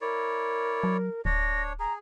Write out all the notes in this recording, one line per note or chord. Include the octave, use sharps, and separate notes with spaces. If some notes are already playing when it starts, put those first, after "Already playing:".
E4 A#4 C#5 D5
F#3
D1 D4 C#5 A#6
G#4 A#5